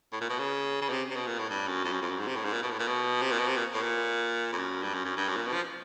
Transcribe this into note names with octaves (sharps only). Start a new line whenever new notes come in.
A2
A#2
B2
C#3
C#3
B2
C3
C3
B2
A#2
A2
G2
F#2
F2
F#2
F2
F#2
G#2
C3
A2
G#2
A#2
B2
A2
A#2
B2
C3
A#2
B2
C3
A#2
A2
A#2
F2
F#2
G2
F#2
F#2
G2
F#2
A#2
B2
F3